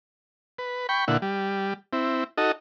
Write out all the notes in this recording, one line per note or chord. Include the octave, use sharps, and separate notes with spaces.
B4
G5 B5 C#6
A#2 D3 E4 F#5
G3
C4 E4
D#4 F#4 A4 D#5